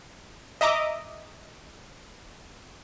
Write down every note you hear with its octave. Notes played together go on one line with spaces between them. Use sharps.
D#5 E5 A#5 D6